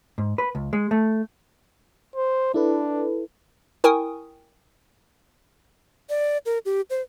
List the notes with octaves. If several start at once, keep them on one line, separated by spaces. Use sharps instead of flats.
G#2
B4
C#2
G#3
A3
C5
D4 E4 A4 B4
E4 A#4 G5 G#5 C#6 D#6
D5
A#4
G4
C5